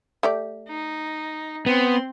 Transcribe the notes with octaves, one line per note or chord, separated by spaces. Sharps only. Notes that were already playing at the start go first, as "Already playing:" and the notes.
A3 G4 D5
D#4
B3 C4 C6